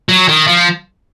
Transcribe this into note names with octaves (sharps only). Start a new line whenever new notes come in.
F#3
D#3
F3